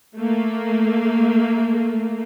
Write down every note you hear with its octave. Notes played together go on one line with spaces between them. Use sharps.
A3 A#3